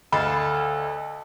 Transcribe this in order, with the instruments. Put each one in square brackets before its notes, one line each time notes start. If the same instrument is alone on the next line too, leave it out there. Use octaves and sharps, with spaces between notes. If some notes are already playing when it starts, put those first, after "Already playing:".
[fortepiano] D2 [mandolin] A4 F5 [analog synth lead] D#5 [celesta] B5